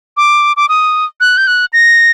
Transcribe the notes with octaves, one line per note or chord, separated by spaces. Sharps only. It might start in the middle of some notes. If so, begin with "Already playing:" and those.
D6
D6
D#6
F#6
G6
F#6
A#6